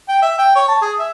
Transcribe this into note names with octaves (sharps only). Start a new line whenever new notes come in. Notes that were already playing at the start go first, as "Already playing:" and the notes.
G5
E5
G5
C#5
A5
G#4
E5